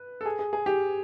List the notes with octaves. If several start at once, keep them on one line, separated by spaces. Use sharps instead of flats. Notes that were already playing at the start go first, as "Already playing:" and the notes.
Already playing: B4
A4
G#4
G#4
G#4
G4